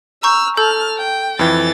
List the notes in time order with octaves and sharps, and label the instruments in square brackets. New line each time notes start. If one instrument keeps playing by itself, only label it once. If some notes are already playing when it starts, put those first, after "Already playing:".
[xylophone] A#5 C#6 G6 [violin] E6 F6
[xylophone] A4 E6 G6 [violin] A5 F6
[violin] G5
[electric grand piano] F2 E3 [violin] A6